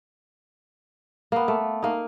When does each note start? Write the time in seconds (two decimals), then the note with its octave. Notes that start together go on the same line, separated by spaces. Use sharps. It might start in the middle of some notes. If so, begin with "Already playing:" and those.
1.32 A#3 B3
1.48 A3
1.82 A#3 D#4